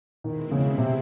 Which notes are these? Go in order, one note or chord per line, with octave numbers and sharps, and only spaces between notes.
B2 D#3 G#3 C4 E4
C#3
C3